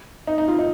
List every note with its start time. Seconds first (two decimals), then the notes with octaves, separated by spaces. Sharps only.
0.27 D#4
0.38 D#4
0.48 F4
0.59 D#4